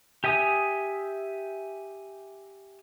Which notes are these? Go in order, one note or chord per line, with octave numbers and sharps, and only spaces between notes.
G4 E5 G#5 D#6